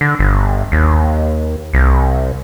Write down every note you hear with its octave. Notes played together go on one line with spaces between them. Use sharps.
D3
G1
D#2
C2